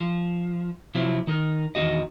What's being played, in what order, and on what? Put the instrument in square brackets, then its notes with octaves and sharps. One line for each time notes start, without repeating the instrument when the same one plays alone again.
[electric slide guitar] F3
C3 F3 F#3 C4 E4
D#3 D#4 A#4
E2 D#3 F4 F#4 D#5